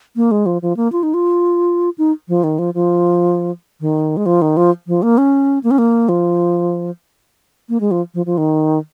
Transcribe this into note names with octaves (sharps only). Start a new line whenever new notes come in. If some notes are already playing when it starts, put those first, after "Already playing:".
A#3
G#3
F3
F3
A#3
F4
D#4
F4
D#4
F3
D#3
F3
F3
D#3
G#3
F3
D#3
F3
F3
A#3
C#4
A#3
C#4
A#3
F3
A#3
G#3
F3
F3
F3
D#3